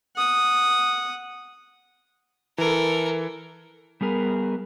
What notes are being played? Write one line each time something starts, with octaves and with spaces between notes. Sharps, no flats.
F#5 D#6
E3 A4 A#4
G3 B3 G#4 A#4